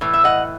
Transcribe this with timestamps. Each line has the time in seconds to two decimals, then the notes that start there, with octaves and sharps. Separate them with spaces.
0.01 A2 E3
0.14 E5
0.24 D#5 F#5